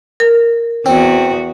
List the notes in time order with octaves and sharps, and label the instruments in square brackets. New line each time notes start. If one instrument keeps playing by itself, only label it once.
[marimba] A#4
[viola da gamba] E2 F#4 [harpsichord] C4